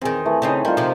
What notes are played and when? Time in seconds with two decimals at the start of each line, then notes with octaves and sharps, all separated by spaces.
0.02 E2 D#3 C4 G#4
0.26 E3 A3
0.42 C#3 C4 D#4
0.65 D#3 G3 F4
0.77 C3 F3